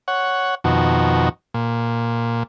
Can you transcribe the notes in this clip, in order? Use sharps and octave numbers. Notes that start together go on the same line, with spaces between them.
C#5 F#5
F2 B2 D#3 F#4
A#2